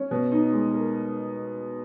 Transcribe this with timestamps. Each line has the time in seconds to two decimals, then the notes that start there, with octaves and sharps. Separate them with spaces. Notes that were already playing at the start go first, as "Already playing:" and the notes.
Already playing: C#4
0.11 B2
0.31 D#4
0.52 G#3
0.73 A#4